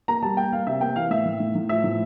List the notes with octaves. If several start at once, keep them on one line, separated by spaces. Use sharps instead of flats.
A#3 A#5
G3 A5
A#3 G5
A#3 F5
C3 E5
A#3 G5
E3 F5
A2 E5
A2
A2
A2
F3 E5
A2